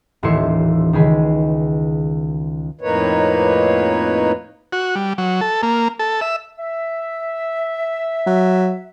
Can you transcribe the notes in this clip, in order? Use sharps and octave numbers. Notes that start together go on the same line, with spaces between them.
D#1 A1 E3 E4 C6 C#7
C#2 D#3 G#3 G#4 B4
F2 A2 A#3 D#4 B4 C#5
F#4
G3
F#3
A4
A#3
A4
E5
E5
F#3